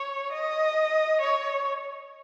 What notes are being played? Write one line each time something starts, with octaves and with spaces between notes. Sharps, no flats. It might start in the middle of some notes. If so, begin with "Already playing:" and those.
Already playing: C#5
D#5
C#5